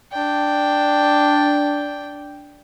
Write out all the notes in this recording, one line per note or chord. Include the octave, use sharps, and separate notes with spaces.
D4 G5